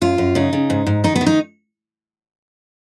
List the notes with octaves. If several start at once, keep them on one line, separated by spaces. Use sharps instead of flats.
F#2 F4
F#2
C#3 D#4
C#3
G#2
G#2
D#3 D#4
B3
D#3
D#4